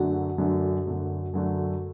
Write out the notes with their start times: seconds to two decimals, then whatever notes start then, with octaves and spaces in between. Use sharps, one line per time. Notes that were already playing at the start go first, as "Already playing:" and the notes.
Already playing: F#2 D3 F#3 A3 D4 F#4
0.38 F#2 D3 F#3 A3 D4
0.86 F#2 D3 F#3 A3 D4
1.33 F#2 D3 F#3 A3 D4